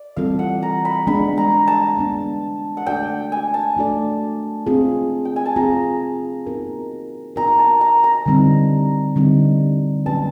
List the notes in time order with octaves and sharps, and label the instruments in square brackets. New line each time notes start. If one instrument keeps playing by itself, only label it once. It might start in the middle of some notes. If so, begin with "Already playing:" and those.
Already playing: [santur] D5
[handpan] E3 G3 C4 F4 A4 [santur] F5
[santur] F#5
A#5
B5
[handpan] G#3 B3 D4 [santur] B5
[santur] A#5
A5
[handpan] G#3 B3 D4
[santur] F#5
[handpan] A3 D4 F#4 A4 D5 [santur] G5
[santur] G#5
A5
[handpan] A3 D4 F#4 A4 D5
C4 F4 G#4
[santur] G5
G#5
A5
[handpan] C4 F4 G#4 [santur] A#5
[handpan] B3 D#4 F#4 A#4
[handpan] B3 D#4 F#4 A#4 [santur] A#5
[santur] A5
A#5
A#5
[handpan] D3 G3 C4 D#4
D3 G3 C4 D#4
[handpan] F#3 A#3 C#4 F#4 B4 [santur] A5